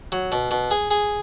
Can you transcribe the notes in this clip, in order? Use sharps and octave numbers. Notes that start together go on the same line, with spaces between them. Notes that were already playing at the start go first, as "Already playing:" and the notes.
F#3
B2
B2
G#4
G#4